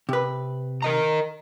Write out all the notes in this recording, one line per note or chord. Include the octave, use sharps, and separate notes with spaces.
C3 B4
A#4 D#5 A#5